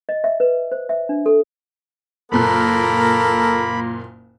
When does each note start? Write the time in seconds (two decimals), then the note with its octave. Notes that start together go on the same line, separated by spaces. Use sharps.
0.09 D#5
0.24 E5
0.40 B4
0.72 C5
0.89 E5
1.09 D4
1.26 A4
2.32 F#1 A#2 A#3 A4 A#4 B5 F#6